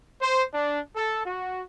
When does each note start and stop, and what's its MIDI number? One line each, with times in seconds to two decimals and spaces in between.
0.22 0.44 72
0.53 0.80 62
0.96 1.22 69
1.26 1.63 66